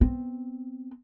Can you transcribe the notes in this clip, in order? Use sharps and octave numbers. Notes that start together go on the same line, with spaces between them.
B3 C4